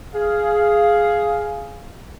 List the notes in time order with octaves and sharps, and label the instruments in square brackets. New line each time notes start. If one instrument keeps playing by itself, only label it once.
[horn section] G#4 F5